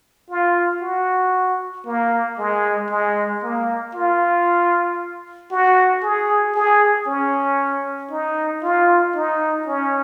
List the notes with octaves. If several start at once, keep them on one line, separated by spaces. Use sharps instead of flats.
F4
F#4
A#3
G#3
G#3
A#3
F4
F#4
G#4
G#4
C#4
D#4
F4
D#4
C#4